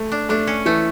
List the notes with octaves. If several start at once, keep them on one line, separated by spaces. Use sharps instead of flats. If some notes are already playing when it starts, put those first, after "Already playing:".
Already playing: A3
D4
A3 D4
C#4
E3 A3